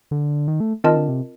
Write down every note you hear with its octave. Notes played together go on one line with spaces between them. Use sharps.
D3
D#3
A3
D#3 C4 F4 A#4 D#5 A5
D3
C3